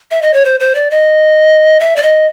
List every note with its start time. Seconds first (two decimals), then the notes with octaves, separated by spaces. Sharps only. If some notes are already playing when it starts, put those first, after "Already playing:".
0.11 E5
0.22 D#5
0.34 C#5
0.45 C5
0.60 C5
0.75 D5
0.91 D#5
1.80 E5
1.96 D5
2.03 D#5